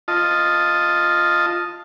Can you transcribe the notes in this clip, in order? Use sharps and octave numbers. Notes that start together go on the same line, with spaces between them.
F4 D#5 A5